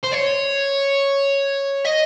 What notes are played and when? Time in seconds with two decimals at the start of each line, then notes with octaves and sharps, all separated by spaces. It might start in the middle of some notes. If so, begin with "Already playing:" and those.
0.03 C5
0.12 C#5
1.85 D#5